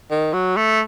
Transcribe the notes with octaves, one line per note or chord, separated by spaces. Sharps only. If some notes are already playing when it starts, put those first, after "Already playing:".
D#3
F#3
A3